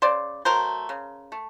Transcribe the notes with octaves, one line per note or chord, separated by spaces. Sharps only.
C#3 C5 D5
F#3 A3 A#4 C5
C#3
A3